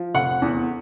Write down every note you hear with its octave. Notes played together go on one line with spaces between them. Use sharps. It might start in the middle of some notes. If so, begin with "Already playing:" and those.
Already playing: F3
F1 F#5
E2